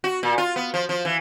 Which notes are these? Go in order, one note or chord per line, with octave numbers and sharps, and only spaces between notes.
F#4
A#2
F4
B3
F3
F3
E3